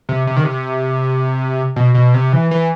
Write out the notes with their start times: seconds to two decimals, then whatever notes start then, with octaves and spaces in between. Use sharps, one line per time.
0.09 C3
0.27 C3
0.36 D#3
0.44 C3
1.76 B2
1.94 B2
2.14 C3
2.33 E3
2.51 E3